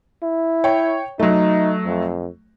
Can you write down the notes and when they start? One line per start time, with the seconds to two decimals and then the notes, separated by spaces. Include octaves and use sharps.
0.23 E4
0.64 C#5 G5
1.20 F#3 A3 D#4
1.85 F2